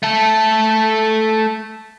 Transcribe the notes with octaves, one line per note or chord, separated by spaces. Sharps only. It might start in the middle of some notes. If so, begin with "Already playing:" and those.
A3 A4